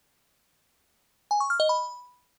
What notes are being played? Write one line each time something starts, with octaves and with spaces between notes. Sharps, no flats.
G#5
C#6
F6
D#5
B5